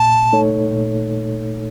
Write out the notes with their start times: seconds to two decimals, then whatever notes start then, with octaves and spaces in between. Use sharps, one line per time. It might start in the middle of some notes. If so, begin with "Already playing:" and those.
Already playing: A#2 A5
0.33 A3 D#4 A4 C#5
0.71 A#2